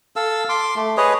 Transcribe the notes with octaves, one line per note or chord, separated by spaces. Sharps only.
A4 F5 E6
C6 D6
A3
G#4 B4 C#5 D#5